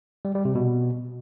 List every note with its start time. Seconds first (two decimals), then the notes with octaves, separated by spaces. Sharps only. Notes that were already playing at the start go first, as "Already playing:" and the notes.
0.25 G3
0.35 G3
0.45 C3
0.55 B2